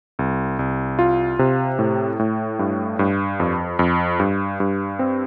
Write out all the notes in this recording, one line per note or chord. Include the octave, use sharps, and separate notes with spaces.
C2
C2
F4
C3
A2
A2
G2
G2
F2
F2
G2
G2
C4